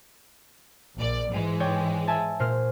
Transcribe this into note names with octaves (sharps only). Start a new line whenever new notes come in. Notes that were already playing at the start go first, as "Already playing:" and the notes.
A#1 D5
G#2 E3 G#3
C#5 D5 G5
E5 G#5 A5
A#2 C5 F6